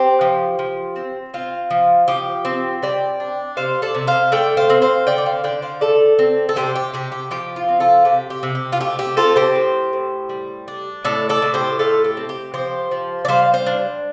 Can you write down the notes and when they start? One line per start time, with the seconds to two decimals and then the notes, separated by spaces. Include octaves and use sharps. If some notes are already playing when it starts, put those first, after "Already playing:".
Already playing: C4 G4 C5
0.21 F3
0.59 F3
0.96 C4
1.34 C4 F4
1.71 F3
2.08 F3 G4
2.45 C4
2.83 G3 D5 G5
3.20 D4
3.57 C3 C5 F5
3.82 A4 D5
3.95 C3
4.07 C5 F5
4.32 A3 D5 G5
4.57 C5 F5
4.70 C4
4.82 C5 F5
5.07 D3 D5 G5
5.18 D5
5.26 C5 F5
5.44 D3 D5 G5
5.62 C5 F5
5.81 A3 A4 D5
6.19 C4
6.49 A4
6.56 C3 G4 C5
6.76 G4
6.93 C3 G4
7.12 G4
7.31 F3 G4
7.56 F4
7.68 C4
7.80 F4 A4
8.05 C3 G4
8.30 G4
8.43 C3
8.55 G4
8.72 F4
8.80 A3 G4
8.99 G4
9.17 C4 F4 A4
9.36 G4 C5
9.56 A2
9.93 A2
10.29 G3
10.68 D4
11.05 A2 A4 D5
11.29 A4 D5
11.42 A2
11.54 G4 C5
11.79 A3 F4 A4
12.04 G4
12.17 C4
12.29 G4
12.54 F3 G4 C5
12.91 F3
13.25 D5
13.28 G3 C5 F5
13.54 C5 F5
13.66 D4